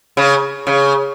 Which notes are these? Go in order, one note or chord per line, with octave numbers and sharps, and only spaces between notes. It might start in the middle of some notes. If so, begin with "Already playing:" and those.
C#3
C#3